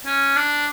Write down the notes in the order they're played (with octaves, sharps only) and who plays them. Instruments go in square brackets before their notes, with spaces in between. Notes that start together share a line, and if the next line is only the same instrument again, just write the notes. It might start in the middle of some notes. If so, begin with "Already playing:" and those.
[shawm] C#4
D4